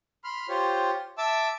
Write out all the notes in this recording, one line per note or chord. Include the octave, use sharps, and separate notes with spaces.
B5 C6 F6
F4 G4 C5 C#5
E5 A5 D6 E6